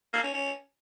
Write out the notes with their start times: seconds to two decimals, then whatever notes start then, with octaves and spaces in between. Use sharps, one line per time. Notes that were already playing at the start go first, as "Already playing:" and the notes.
0.13 A#3
0.23 C#4
0.33 C#4